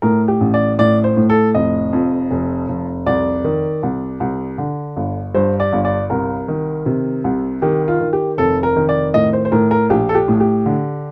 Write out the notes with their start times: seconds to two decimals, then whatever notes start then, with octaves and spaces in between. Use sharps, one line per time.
0.02 A2 A#4
0.28 G4
0.41 A1
0.54 D5
0.79 A2 D5
1.04 C5
1.17 A2
1.30 A4
1.55 F1 D#5
1.93 F2
2.31 F1
2.69 F1
3.06 C2 D5
3.44 D#3
3.83 C2
4.20 C2
4.58 D3
4.96 G1
5.35 G2 C5
5.60 D5
5.73 G1
5.85 D5
6.10 C2 A#4
6.48 D#3
6.86 C3
7.24 C2
7.62 D#3 G4
7.88 F4
8.01 D#3
8.13 G4
8.38 F1 A4
8.63 A#4
8.76 D#3
8.89 D5
9.14 A2 D#5
9.33 C5
9.45 C5
9.52 A2 A#4
9.71 A#4
9.90 A#1 G4
10.09 A4
10.15 G4
10.28 A2
10.40 G4
10.66 D3